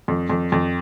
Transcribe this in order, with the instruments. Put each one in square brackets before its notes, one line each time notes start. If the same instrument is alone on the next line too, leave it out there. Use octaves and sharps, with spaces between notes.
[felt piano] F2
F2
F2